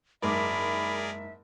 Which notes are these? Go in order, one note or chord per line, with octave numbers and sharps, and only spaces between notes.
F#1 G#2 G#4 A#4 D5 E5 B5 D6